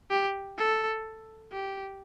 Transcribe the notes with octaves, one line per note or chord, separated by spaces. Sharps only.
G4
A4
G4